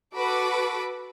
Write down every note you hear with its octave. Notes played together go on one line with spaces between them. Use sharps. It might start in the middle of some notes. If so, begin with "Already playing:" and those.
F#4 A4 B4 B5 D6